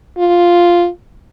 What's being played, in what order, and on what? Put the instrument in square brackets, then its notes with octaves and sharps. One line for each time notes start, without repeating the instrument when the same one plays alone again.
[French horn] F4